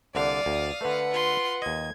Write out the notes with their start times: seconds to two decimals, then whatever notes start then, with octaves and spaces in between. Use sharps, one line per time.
0.15 C2 D3 D5 F5 D#6
0.46 D2
0.81 D3 A3 B4 F#5
1.11 F4 C6
1.62 D#2 D#5 G#6